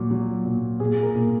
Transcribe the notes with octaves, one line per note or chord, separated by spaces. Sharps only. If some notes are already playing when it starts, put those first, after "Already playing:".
Already playing: A#2 F#3
F#3
A#2
A#2 G#4
A#4
A#2